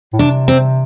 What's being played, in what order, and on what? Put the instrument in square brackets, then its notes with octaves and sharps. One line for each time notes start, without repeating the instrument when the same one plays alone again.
[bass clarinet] A2
[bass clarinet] C3 [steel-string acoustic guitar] D4
[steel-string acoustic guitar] C4